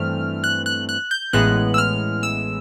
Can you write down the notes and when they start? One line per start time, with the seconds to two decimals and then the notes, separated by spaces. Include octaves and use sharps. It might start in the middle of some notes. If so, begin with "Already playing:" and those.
Already playing: G2 E3 A3 C4 F6
0.44 F#6
0.66 F#6
0.89 F#6
1.11 G6
1.33 A1 A2 E3 G#3 B3 F#6
1.74 E6
1.78 F6
2.23 E6